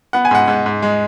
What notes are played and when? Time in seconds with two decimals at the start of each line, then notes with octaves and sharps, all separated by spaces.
0.13 B3 F#5
0.25 G#5
0.31 G#2 F#5
0.48 G#2
0.66 G#2
0.82 G#3